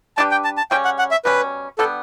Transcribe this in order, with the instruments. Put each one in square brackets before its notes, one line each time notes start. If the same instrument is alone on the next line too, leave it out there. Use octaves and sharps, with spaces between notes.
[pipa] G3 D4 G4 B4 [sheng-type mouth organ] A5
[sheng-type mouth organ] G5
A5
A5
[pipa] C#3 G3 C#4 [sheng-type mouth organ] G5
[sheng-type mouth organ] F#5
F#5
E5
[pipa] B2 G3 C#4 [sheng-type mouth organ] B4
[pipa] D3 G3 B3 [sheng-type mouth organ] A4